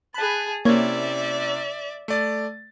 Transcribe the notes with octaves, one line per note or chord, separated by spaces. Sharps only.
G#4 A5 B5 F#6
C3 A#3 C#4 E4 C#5 D5 E5 G#6
A3 D5 A6